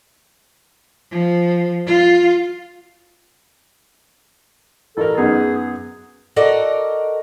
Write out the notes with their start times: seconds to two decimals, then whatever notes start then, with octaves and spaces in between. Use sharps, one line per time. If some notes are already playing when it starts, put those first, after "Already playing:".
1.11 F3
1.86 F4
4.97 A1 A4 A#4
5.17 F#2 B3 D#4 G#4
6.36 F#4 A4 A#4 D5 D#5 F#5